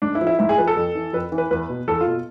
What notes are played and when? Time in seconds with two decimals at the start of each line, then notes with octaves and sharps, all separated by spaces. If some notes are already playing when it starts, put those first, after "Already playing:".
0.02 G#2 D4
0.15 E4
0.21 F3
0.27 E4
0.39 G#2 E4
0.49 G#4
0.58 F3 B4
0.68 A4
0.77 F2
0.95 E3
1.13 F2 B4
1.32 E3
1.38 B4
1.51 E2 B4
1.70 B2
1.88 E2 A4
2.01 F4
2.07 B2